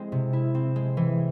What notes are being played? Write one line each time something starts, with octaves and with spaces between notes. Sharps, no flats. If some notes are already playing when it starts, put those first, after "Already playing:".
Already playing: G#3 C4 E4
C3
E4
C4
G#3
E3